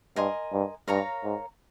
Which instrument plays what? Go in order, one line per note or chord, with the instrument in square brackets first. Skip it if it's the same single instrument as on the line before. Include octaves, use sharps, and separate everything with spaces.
[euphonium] G2 [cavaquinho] A#4 D#5 G#5 C6
[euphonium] G2
[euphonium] G2 [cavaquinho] A#4 C#5 F5 A#5
[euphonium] G#2